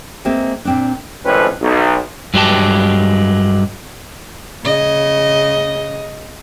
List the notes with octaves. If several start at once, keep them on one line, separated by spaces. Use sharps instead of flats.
G#3 A#3 C4 E5
A#2 C4 D4
G#1 F2 A2 C4 C#4 B4
B1
G2 F#3 G#3 G4 A5
C#3 D#5